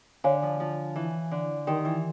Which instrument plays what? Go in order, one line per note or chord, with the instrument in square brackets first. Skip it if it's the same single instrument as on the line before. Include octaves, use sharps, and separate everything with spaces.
[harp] D3 [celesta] C#5 F5 G#5
[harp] F3
F3
E3
D3
[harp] D#3 [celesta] G4 A#4 D5 G5 C6
[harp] E3